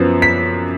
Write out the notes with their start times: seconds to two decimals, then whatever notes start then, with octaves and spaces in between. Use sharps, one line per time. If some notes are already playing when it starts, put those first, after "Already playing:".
Already playing: F#2 F3 B3
0.22 B6